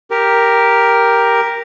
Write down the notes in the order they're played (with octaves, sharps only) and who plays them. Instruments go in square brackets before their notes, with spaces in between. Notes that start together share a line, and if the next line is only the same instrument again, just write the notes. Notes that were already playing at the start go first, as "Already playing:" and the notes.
[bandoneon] G4 A#4